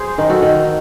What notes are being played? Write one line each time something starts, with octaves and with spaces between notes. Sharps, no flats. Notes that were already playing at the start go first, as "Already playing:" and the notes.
Already playing: G#4 C5
D#3
F#4 A4
D#3